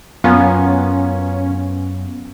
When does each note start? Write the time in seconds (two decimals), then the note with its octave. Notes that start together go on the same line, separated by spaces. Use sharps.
0.24 F#2 B3 C#4 F4 A#4 G#5